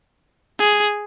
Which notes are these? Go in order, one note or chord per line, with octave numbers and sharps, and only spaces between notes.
G#4